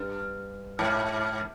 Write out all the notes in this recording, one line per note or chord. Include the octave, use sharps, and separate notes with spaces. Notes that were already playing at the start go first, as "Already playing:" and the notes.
Already playing: G2
G#2